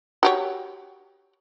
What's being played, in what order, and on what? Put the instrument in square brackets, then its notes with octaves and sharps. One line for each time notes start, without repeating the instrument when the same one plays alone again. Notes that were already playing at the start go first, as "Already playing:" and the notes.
[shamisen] F#4 G4 C#5